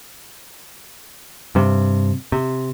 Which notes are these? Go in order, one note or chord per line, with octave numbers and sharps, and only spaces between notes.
G2 C3
C3